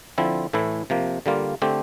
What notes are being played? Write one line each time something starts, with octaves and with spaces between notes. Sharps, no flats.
D3 F3 C4 E4
A2 E3 A3 E4
C3 F3 A#3
D3 G3 A#3 F4
D3 A3 C4 G4